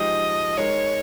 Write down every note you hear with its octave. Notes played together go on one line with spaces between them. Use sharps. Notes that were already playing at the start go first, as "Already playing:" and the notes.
Already playing: F3 G#3 D#4 G4 D#5
G#3 D#4 A#4 C#5